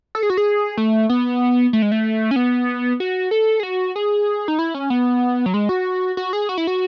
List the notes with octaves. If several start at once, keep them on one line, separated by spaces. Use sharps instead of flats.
A4
G#4
F#4
G#4
A3
B3
A3
G#3
A3
C#4
B3
F#4
A4
G#4
F#4
G#4
D#4
E4
C#4
B3
F#3
G#3
F#4
F#4
G#4
F#4
E4
F#4